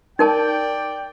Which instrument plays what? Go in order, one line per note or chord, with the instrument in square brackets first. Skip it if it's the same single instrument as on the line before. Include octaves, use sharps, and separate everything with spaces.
[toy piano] D#4 A#4 A5 [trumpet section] D5 G5